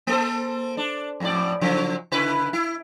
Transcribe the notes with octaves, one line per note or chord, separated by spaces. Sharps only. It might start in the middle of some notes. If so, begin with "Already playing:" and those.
A#3 A4 C5
D4
F2 A2 D5
C#3 F3 F#3
C#3 E4 B4
E4